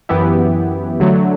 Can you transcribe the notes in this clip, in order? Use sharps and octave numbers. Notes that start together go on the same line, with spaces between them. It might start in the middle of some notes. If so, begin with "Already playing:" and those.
F#2 E3 B3 E4 G4
D3 F#3 A3